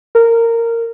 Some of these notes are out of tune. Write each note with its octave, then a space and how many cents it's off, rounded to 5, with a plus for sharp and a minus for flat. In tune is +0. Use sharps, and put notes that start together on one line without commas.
A#4 -15